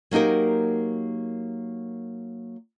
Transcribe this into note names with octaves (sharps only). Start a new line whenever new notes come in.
F#3 A#3 D#4 G4 A#4